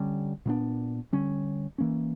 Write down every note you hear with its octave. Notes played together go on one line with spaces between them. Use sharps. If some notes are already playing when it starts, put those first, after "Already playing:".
Already playing: D3 G3 C#4
A#2 G3 B3 D4
D3 G3 C#4
E3 A#3 C#4